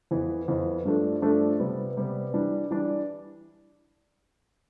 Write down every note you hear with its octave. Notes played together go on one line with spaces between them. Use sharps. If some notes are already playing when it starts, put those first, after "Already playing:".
F2 E3 B3
F2 E3 B3
G2 F3 A3 D4
G2 F3 A3 D4
C3 G3 B3
C3 G3 B3
E3 G3 D4
E3 G3 D4